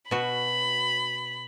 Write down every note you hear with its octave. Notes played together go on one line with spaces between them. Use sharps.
B2 F#4 B5